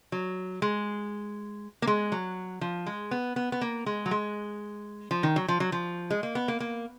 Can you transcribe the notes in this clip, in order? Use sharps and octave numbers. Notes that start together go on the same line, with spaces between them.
F#3
G#3
A#3
G#3
F#3
F3
G#3
B3
B3
B3
A#3
G#3
F#3
G#3
F3
D#3
F#3
F3
F#3
F3
G#3
A#3
B3
A#3
A#3